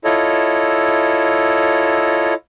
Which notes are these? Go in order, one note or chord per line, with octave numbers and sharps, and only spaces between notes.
E4 F4 A4 C#5 D#5